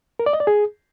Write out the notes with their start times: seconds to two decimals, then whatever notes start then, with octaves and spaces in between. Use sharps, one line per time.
0.19 A#4
0.26 D5
0.33 D#5
0.40 D5
0.47 G#4